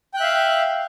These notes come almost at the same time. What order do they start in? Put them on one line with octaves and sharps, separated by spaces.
G5 F#6 E5 F5